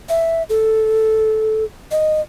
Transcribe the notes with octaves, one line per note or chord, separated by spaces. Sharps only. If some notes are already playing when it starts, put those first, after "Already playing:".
E5
A4
D#5